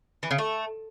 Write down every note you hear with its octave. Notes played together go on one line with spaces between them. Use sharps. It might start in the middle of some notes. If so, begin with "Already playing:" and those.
E3
C#3
A3